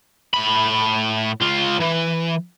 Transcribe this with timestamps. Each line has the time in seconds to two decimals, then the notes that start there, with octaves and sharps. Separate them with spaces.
0.34 A2 B5
1.41 C#2 F4
1.80 E3